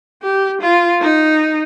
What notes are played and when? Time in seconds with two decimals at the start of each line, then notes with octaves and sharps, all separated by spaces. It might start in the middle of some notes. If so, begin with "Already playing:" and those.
0.23 G4
0.62 F4
1.01 D#4